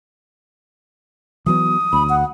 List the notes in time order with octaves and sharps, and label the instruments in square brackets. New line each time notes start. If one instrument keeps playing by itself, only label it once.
[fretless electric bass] E3 F#3 B3 [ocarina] D#6
[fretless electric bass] D2 [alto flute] B5
[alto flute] F#5